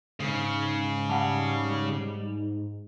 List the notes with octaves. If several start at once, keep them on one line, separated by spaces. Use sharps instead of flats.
G#2 C#3
G3 F5 F#5 A5